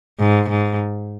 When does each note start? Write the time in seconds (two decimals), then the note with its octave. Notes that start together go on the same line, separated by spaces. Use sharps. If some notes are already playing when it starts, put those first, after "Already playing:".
0.19 G#2
0.49 G#2